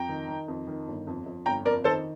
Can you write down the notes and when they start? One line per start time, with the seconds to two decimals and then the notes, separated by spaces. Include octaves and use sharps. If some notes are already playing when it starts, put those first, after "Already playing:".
Already playing: F2 G5 A#5
0.09 D#3
0.28 D#3
0.48 F2
0.67 D#3
0.88 G1
1.07 F2
1.26 F2
1.46 G1 G5 A#5
1.65 F2 A#4 D5
1.84 D#3 A4 C5